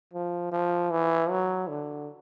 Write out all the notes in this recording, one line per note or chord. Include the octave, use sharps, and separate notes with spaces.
F3
F3
E3
F#3
D3